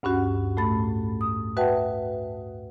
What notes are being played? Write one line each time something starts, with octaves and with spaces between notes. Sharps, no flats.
D2 G2 C#4 F#4 F#5
A2 A3 B5 A6
D#6
F#4 B4 E5 F#5 G5 A5